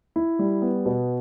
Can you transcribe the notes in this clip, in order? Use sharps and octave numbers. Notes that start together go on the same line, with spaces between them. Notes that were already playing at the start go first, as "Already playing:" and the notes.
E4
G3
B3
B2